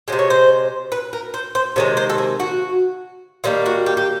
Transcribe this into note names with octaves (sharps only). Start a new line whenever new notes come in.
C3 F3 G#3 C5
C#5
C5
B4
A#4
C5
C5
C3 D#3 G#3 C#5
C5
A4
G#4
F#4
D#3 G3 A#3 F4
F#4
G4
G4